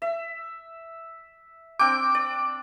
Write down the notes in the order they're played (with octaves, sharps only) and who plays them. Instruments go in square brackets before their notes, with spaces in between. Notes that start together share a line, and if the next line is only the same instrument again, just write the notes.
[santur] E5
[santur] C4 D4 G5 [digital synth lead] D6
[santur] D5